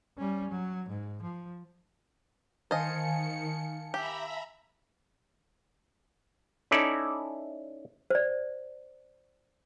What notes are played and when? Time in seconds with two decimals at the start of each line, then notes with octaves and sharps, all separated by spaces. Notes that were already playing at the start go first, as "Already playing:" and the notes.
0.18 G3 C#4
0.51 F#3
0.89 G#2
1.22 F3
2.71 D#3 C5 D#5 F5 G#5 A5 C#7
3.94 G4 E5 A#5 B5
6.71 C#4 D#4 E4 A4 D5
8.10 C5 D5